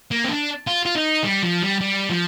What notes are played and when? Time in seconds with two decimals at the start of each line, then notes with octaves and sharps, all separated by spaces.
0.11 A#3
0.24 C4
0.29 D4
0.67 F4
0.86 F4
0.95 D#4
1.24 G3
1.43 F3
1.63 G3
1.81 G3
2.10 F3